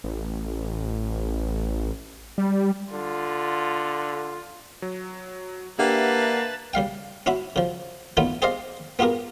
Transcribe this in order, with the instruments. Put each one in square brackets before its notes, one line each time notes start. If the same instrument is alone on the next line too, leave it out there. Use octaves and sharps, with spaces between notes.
[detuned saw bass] A1
G3
[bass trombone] D3 [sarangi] F4
[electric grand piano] F#3
[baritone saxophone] A#3 [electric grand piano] D4 E5 F#5 [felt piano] G4 [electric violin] B4 A5
[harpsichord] C#3 G3 F5 G5
C#4 E4 F#4 B5
C#3 F3
E3 A3 B3 C#4 D#4 F4
G4 G#4 C5 D5 D#5 F5
B3 F4 G4 G#4 A#4